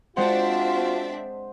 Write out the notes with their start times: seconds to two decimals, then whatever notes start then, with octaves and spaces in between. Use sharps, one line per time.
0.17 G#3 C4 D4 F4 F#4 C5 E5 F#5